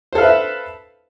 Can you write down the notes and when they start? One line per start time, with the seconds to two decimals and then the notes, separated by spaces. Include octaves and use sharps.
0.13 C5
0.15 A4
0.18 F5
0.21 B4
0.23 E5